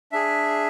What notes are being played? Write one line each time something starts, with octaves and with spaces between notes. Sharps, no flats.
D4 G#4 E5